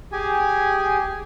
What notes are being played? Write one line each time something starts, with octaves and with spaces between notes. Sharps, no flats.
G4 G#4 G#5